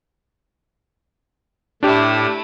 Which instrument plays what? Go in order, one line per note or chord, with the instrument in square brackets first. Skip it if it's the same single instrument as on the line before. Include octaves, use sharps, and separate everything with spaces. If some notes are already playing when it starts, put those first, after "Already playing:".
[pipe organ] A2 [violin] A3 E4 [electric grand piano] D4 G4